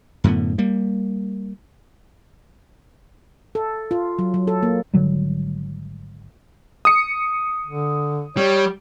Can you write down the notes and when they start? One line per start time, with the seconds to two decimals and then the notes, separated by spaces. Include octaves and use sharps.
0.24 F#2 A2 D3 B3
0.58 G3 A#3
3.55 A4
3.91 F4
4.19 F#3
4.34 F#3
4.47 A4
4.63 A#3
4.94 G#1 D3 F#3 G3
6.85 D#6 C#7
7.66 D3
8.37 G3 C#5